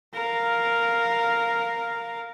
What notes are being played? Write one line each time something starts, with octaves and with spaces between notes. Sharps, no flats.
A#4 F5